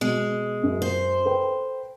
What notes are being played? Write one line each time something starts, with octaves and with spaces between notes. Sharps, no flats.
B2 G#3
F#2
C5
A4 B4 G5